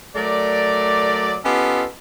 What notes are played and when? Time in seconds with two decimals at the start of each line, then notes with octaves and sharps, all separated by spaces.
0.16 F#3 A3 A#4 D5
1.45 B3 C#4 F4 G4 A4 D#5